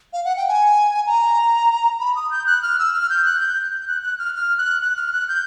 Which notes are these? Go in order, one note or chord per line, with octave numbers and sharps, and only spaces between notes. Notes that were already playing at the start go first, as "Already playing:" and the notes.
F5
F#5
G5
G#5
A#5
B5
D#6
G6
F#6
F6
E6
F6
G6
F#6
G6
G6
F#6
F#6
F6
F6
F#6
F#6
F6
F#6
G6